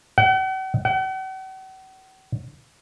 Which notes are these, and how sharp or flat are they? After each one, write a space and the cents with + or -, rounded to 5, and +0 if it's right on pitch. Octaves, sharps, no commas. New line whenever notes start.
F#5 +45
F#5 +45